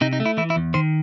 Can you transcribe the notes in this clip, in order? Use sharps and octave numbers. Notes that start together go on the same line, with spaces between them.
C3 D#4
D#4
A3
E4
E3 E4
E4
E2
D#3 C5